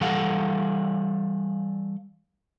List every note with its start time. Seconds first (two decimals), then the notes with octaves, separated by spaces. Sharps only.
0.01 E3 G3 A4 F5 F#5